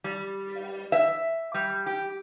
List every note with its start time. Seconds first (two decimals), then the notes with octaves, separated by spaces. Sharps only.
0.04 G3
0.92 E5
1.54 G3
1.86 G4